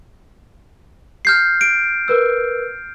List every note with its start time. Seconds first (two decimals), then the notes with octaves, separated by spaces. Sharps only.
1.25 F6 G6 C7
1.61 D7
2.08 A#4 B4 E6